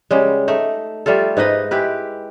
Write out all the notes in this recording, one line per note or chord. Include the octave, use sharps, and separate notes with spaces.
C#3 G3 G#3
A3 D#4
G3 A3 F4 A4
G#2 D#4 B4 D#5
G#3 E4 G4 B4